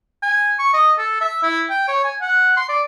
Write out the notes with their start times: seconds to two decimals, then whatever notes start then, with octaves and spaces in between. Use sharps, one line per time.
0.23 G#5
0.59 C#6
0.74 D#5
0.98 A4
1.21 E5
1.43 E4
1.70 G5
1.88 C#5
2.04 G#5
2.21 F#5
2.57 C6
2.69 D5